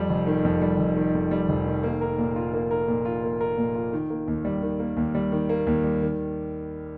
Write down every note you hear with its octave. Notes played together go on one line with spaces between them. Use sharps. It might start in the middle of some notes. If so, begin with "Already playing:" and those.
Already playing: F2 G3
F1
D#3
F2
G3
F1
D#3
F2
G3
F1
D#3
A#3
A#4
A#2
F4
A#3
A#4
A#2
F4
A#3
A#4
A#2
F4
D#3
A#3
D#2
G3
D#3
A#3
D#2
G3
D#3
A#3
D#2
G3
D#3